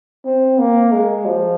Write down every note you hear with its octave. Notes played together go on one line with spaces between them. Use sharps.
C4
A#3
G#3
F3